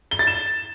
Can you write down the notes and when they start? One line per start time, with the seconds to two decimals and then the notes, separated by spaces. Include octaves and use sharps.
0.11 G7
0.19 A6
0.27 E7